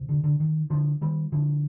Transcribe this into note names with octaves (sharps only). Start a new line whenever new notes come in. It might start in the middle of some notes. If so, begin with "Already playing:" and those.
Already playing: D2 C3
D3
D3
D#3
D3 F3
D#3 G3
D3 F3